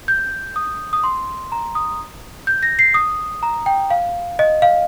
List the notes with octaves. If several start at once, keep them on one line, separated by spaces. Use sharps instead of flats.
G6
D#6
D#6
C6
A#5
D#6
G6
A#6
C7
D#6
A#5
G5
F5
D#5
F5